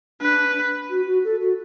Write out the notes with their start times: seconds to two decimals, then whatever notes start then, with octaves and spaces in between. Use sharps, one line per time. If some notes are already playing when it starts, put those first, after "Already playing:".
0.21 D4 B4
0.90 F#4
1.06 F#4
1.24 A4
1.41 F#4